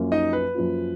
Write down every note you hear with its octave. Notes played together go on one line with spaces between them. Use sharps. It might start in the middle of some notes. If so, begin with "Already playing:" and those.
Already playing: F#2 F3 A#3 C#4 F4
D#4 D#5
B4
F#2 F3 A#3 C#4 F4